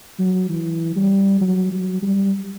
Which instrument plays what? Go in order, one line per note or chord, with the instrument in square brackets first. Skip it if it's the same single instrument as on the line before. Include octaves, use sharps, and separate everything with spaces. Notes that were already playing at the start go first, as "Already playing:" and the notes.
[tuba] F#3
E3
G3
F#3
F#3
G3